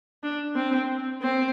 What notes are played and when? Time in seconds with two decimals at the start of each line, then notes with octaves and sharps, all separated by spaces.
0.23 D4
0.56 C4
1.22 C4